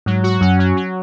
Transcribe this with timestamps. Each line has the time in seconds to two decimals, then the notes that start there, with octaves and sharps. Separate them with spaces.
0.06 G#2 F#3
0.23 F#4
0.41 F#2 C#4
0.59 F#3
0.77 F#3